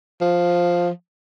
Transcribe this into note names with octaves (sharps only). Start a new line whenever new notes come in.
F3